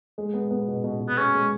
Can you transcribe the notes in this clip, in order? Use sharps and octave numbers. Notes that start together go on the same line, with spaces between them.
G#3
B3
B3
B2
B2
B2
B3
C#4 G#4
G#3